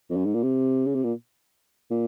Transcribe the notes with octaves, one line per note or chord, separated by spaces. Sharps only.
F2
F#2
G#2
A#2
C3
C#3
C3
A#2
A#2